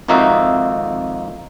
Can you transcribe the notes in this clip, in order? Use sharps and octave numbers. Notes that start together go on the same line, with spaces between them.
G#1 F2 A#3 D#4 F#4 E5